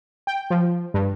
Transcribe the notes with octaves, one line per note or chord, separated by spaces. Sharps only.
G5
F3
G2